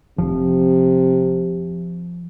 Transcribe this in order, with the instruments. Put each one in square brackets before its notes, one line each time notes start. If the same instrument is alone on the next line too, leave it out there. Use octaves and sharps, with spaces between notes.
[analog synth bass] F1 [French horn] C3 [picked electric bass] F3